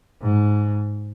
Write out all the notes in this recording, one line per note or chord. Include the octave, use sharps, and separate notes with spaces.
G#2